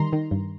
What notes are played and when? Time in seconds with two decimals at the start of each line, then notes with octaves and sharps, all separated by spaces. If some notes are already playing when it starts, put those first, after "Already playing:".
Already playing: D#3 G3 A#5 C6
0.13 D#3
0.31 G2